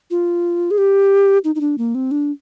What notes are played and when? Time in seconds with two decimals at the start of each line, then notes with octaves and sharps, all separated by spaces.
0.11 F4
0.71 G#4
0.78 G4
1.44 D#4
1.55 D#4
1.61 D4
1.78 A#3
1.95 C4
2.11 D4